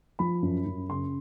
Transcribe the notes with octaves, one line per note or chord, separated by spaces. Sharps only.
F3 B5
F#2
F#2
C#3 C6